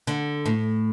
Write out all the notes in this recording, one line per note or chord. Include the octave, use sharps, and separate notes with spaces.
D3
A2